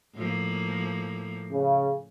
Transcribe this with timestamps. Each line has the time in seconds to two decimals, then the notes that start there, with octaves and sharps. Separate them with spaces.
0.15 A2 F3 A#3
1.51 C#3